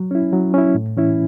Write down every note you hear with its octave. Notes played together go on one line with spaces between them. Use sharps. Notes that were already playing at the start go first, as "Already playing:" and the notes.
Already playing: F#3
C#4 E4
F#3
C#4 E4
A2
E3 C#4 E4